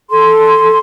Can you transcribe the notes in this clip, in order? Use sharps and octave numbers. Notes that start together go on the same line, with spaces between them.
A4 C6